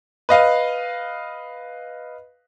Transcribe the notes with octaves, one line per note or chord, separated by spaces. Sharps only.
B4 D#5 F5